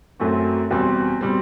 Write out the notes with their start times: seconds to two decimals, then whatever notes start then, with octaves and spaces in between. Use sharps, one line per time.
0.20 F#2 F#3 A3 C4 F#4
0.70 E2 B2 G3 C4
1.21 B2 G3 C4